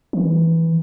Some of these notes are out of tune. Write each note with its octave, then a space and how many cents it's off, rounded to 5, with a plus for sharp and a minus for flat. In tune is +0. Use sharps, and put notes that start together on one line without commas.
E3 -5